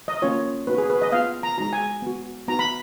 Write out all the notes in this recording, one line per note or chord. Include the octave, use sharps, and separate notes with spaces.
D#5
A#3 C#4 F4 C#5
B3 D#4 F#4 B4
G#4
B4
D#5
B3 F4 F5
A#5
G#3 D#4 F#4 A#5
G#5
B3 F#4
B3 D#4 F#4 A#5
B5